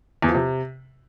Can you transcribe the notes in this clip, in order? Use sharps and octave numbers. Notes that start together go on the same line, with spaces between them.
E2
F3
C3